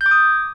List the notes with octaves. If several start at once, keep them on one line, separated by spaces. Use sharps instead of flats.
G6
D6
D#6